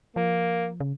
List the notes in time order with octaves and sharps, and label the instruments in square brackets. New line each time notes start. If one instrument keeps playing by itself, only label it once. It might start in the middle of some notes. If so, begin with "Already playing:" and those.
[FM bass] F3 [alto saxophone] A#3
[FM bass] C#3